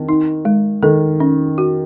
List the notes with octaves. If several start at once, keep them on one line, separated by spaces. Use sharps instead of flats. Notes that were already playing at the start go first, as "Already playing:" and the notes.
Already playing: D#3 C4
D#4
G#3
D#3 A4
C#4
F#4